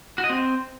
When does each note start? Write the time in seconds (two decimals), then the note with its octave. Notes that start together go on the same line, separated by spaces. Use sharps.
0.18 F#4
0.24 D#5
0.30 C4